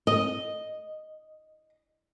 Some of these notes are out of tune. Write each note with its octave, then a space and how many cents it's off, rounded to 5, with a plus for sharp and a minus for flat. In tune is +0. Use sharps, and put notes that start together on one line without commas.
D#5 +0